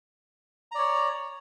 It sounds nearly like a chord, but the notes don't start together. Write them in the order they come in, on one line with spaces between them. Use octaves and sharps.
A#5 D5 C#5